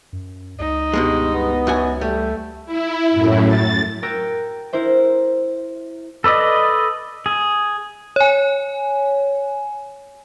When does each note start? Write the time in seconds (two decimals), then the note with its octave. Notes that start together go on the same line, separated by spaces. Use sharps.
0.13 F#2
0.59 C#2 D#4
0.93 G2 B2 G#3
1.33 B3
1.67 F#2 F#4 G#5
2.01 G3 A3
2.66 E4
3.11 F#2 A2
3.47 A6
4.02 F#4 A#4 G5 E6 A#6 D7
4.73 E4 A#4 C5 E5
6.24 A4 B4 D5 D#5
7.26 G#4
8.16 C#5 G#5